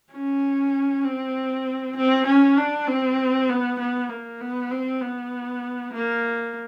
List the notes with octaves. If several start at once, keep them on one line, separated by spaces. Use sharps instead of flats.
C#4
C4
C4
C#4
D4
C4
B3
B3
A#3
B3
C4
B3
A#3